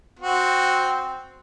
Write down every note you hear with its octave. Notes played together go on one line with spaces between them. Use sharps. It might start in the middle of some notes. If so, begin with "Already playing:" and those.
C4 F#4